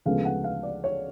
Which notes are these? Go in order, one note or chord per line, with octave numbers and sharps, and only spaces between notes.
D2 C#3 F3 G#3 B3 F5
F#5
F5
D5
C#5